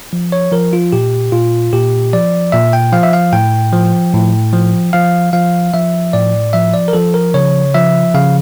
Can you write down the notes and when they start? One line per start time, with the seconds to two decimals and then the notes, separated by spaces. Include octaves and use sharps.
0.13 F3
0.32 C#5
0.52 F3 A#4
0.73 F4
0.92 A#2 G4
1.32 A#2 F4
1.73 A#2 G4
2.13 F3 D5
2.52 A#2 E5
2.73 G5
2.92 F3 F5
3.03 E5
3.13 F5
3.33 A2 G5
3.73 F3
4.14 A2
4.53 F3
4.93 F3 F5
5.33 F3 F5
5.74 F3 E5
6.13 A2 D5
6.53 F3 E5
6.74 D5
6.88 A#4
6.93 F3 A4
7.14 A#4
7.34 C#3 C#5
7.75 F3 E5
8.14 C#3 F5